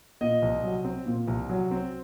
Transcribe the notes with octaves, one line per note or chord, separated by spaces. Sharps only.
A#2 D#5
C2
F#3
C4
A#2
C2
F#3
C4